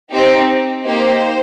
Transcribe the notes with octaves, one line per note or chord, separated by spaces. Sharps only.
C4 D#4 G4
A#3 D#4 G4 C5